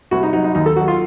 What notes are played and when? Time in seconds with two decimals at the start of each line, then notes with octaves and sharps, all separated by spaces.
0.11 C2 F#4
0.23 D#4
0.33 F#3 D#4
0.44 D#4
0.55 D#2 D#4
0.66 A4
0.76 F#3 F#4
0.88 F4